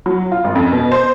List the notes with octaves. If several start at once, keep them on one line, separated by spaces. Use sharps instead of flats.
F#3
F4
G#1
F2
B2
C5